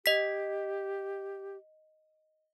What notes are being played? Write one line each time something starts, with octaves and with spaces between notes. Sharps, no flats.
G4 D#5 B6